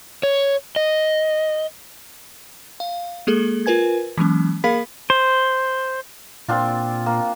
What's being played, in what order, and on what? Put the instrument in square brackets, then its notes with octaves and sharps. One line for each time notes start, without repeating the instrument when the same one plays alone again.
[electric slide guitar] C#5
D#5
[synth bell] F5
G#3 A#3 G#4 A4
F4 A#4 B4 G#5 G#6
E3 F#3 G#3 A#3 C#4
A#3 G#4 A#4 F5 B5 B6
[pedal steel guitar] C5
[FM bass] A#2 [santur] C4 D4 F4
[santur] A#3